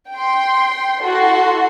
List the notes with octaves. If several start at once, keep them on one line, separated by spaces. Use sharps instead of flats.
G5 C6
E4 F#4 A4 C6